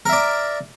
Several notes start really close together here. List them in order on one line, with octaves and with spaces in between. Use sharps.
A#4 E5 D5